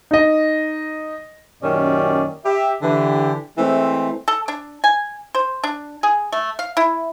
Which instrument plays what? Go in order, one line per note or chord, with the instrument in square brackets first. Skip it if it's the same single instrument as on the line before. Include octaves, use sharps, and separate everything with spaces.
[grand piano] D#4 D#5
[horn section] F#2 A#2 D#3 C#4 G4 D5
G4 E5
D3 E3 G4
E3 G#3 A3 C4
[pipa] A4
D4
G#5
C5
D4
G#4
A3
F5
E4